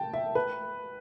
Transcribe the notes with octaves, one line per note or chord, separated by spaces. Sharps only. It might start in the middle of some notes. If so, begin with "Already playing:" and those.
Already playing: G5 A5
E5
B4